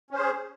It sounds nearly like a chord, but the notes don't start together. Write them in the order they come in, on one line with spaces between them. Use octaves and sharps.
C#4 C5 G#4